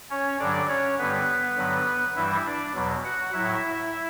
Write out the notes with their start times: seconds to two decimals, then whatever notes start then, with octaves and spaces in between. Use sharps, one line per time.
0.10 C#4 C#5
0.39 G2 D3 F#3 D4 D5
0.69 C#4 C#5
0.99 G2 D3 G3 B3 B4
1.57 G2 D3 F#3
2.15 G2 E3 G3 E4 E5
2.46 D4 D5
2.74 E2 B2 F#3
3.04 F#4 F#5
3.33 A2 F#3 E4 E5